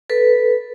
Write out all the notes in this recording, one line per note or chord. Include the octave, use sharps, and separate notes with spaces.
A4 B4